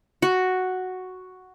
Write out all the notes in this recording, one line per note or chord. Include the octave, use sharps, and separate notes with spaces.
F#4